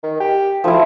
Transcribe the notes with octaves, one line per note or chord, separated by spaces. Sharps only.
D#3
G4
D2 F3 E4